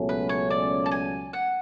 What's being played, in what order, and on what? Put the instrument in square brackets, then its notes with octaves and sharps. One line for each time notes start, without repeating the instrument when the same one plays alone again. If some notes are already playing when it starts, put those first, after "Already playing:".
Already playing: [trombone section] C#2 B2 F#3 A3 C#4
[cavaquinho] B4
C#5
D5
A5
G#5
F#5